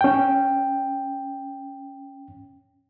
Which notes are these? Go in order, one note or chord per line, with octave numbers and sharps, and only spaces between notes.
C#4 G5